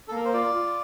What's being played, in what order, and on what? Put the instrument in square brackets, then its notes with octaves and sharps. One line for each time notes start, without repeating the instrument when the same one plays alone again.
[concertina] A4
A#3 A#4
C5
F4 D5
F4